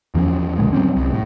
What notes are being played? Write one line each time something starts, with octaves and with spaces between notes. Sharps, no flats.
E2 F3 A#3 C#4
B1 A#2 D3 G#3
F#3 G3 C4 C#4
C2
A2